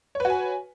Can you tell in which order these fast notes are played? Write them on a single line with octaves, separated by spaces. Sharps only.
C#5 B4 F#4 G#5